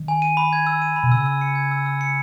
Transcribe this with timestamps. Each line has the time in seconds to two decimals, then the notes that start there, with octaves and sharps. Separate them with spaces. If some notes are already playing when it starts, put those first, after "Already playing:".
Already playing: D#3
0.08 G#5
0.22 D#7
0.37 B5
0.53 G#6
0.67 E6
0.82 D#7
0.96 B5
1.03 B2
1.12 C#3 E6
1.26 E6
1.41 C#7
1.55 G#6
1.71 E6
1.86 E6
2.01 C#7